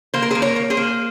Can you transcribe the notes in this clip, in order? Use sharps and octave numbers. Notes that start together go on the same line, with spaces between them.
A#3 C5
A#4
G#4 C5
A#3
A#4 C#5
A#3
G#4 C5
A#3